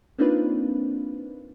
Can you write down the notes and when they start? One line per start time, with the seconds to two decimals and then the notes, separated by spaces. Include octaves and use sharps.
0.18 A#3 C4 D4 D#4 F4 B4